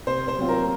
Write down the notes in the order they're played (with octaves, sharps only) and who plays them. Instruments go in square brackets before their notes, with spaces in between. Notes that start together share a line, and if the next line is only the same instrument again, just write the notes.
[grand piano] C3 [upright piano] C5
[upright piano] C5
[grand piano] F#3 C4 F4
[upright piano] A#4